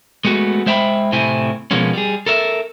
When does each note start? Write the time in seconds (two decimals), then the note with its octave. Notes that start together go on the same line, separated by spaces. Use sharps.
0.25 G#3 A3 B3 F#4
0.66 G#3 C5 E5 G5 A#5 B5
1.12 A2 C3 C4 E4 G#5
1.71 B2 F3 G#3 A#3 B3 C#4
1.93 G3 G#4
2.26 A4 A#4 E5